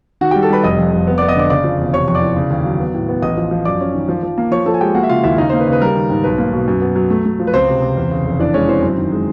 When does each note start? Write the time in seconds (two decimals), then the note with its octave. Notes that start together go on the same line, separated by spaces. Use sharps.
0.21 D#3 F#4 F#5
0.31 G4 G5
0.36 G3
0.42 A4 A5
0.50 G3 B4 B5
0.63 F1 D#5 D#6
0.78 F2
0.92 F1
1.07 B3
1.18 D5 D6
1.22 B3
1.28 D#5 D#6
1.36 D3 D5 D6
1.50 C#3 D5 D6
1.64 F3
1.78 E1
1.93 C3 C#5 C#6
2.08 F2 C#6
2.15 D5 D6
2.22 E3
2.36 C#3
2.51 D#2
2.65 F#3
2.80 B3
2.94 A2
3.09 B3
3.22 A1 D#5 D#6
3.37 F3
3.51 F3
3.65 F#2 D5 D6
3.81 C#4
3.94 D#3
4.09 F3
4.23 F3
4.38 A#3
4.52 F3 C#5 C#6
4.66 F3 A4 A5
4.74 G#5
4.81 G#3 G4 G5
4.95 A#3 F#4 F#5
5.03 E5
5.09 C#3 F4 F5
5.23 D#2 E4 E5
5.38 C#3 D#4 D#5
5.49 A#3 C5
5.60 B4
5.67 C#3
5.72 B4
5.81 G3 A#4
5.95 D#3
6.10 G#2
6.24 B1 B4
6.38 A#3
6.53 B2
6.68 F#2
6.82 B3
6.96 F#3
7.10 A3
7.25 A3
7.40 F3
7.47 B4
7.53 C#2 C4 C5
7.68 C3
7.82 C3
7.97 E2
8.11 C#3
8.25 F1
8.39 E3 D4 D5
8.54 G#3 C#4 C#5
8.68 E3 C4 C5
8.83 F#2
8.98 D#3
9.12 G#3